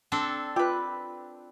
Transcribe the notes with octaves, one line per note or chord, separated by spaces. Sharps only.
C4 D4 A4
F4 G4 B4